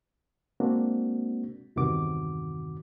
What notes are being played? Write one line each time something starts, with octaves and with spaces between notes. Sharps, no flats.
G#3 A#3 C4 D4 F#4
E2 G2 C3 D#3 F#4 D6